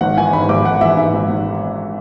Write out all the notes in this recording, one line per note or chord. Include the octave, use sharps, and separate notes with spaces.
G#1 F#5
E3 G#5
G#2 B5
G#1 D6
G#1 F#5
E3 E5
G#2 E5
G#1
G#1